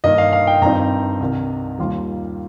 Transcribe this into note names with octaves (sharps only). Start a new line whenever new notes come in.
G2 D#3 A#3 D#5
F5
F5
G5
G2 D#3 C4 D#4 A#5
C2 C3 D#3
D#2 D#3 G3 A#3 F4